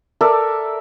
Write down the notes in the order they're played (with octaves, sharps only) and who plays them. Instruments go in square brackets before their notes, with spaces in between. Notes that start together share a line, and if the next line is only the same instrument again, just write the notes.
[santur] A4 A#4 D5 E5